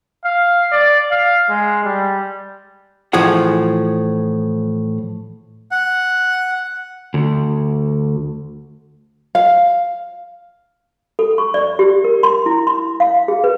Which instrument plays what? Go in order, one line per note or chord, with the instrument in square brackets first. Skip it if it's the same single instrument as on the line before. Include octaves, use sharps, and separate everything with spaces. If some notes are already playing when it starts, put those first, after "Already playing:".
[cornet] F5
D5
F5
G#3
G3
[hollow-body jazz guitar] A2 E3 F3 G#4 F#5
[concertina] F#5
[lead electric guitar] D2
[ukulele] F5
[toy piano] A4
C#6
D5
G4
A#4
C6
E4
C6
F5
G#4
B4